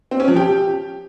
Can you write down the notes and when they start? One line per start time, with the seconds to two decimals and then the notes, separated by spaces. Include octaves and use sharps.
0.11 C4
0.20 C#4
0.28 F3
0.36 G4